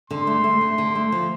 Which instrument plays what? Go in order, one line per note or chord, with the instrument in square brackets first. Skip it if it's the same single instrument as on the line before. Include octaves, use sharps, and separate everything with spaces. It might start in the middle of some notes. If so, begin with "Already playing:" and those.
[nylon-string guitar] D3 [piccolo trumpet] C6
[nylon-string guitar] A3
A3
D3
D3
A3
F3